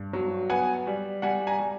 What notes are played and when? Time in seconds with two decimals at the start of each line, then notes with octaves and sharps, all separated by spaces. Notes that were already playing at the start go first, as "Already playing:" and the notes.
Already playing: G2
0.13 F#3
0.50 B3 F#5 G#5
0.87 G3
1.22 G3 F#5 G#5
1.47 G#5 A#5
1.59 G3